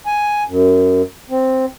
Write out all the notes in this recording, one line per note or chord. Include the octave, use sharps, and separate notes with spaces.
G#5
F#2
C4